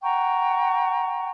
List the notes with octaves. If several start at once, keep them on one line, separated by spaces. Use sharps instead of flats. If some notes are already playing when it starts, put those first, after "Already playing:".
F#5 G5 A#5 C#6